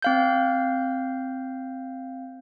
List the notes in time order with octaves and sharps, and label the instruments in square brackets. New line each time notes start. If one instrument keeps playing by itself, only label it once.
[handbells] C4 F5 G6